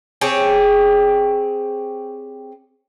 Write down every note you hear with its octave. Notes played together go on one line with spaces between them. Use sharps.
C4 G4 G#4 C#5